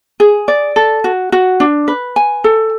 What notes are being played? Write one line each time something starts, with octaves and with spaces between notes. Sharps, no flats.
G#4
D5
A4
F#4
F#4
D4
B4
G#5
A4